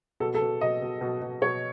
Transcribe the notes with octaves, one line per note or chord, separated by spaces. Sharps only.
B2 A4
A4
B2
B2 D#5
B2
B2
B2
B2 C#5